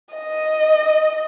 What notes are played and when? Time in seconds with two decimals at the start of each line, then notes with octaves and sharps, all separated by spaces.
0.15 D#5